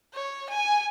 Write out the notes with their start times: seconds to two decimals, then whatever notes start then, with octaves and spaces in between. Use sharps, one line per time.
0.14 C#5
0.50 G#5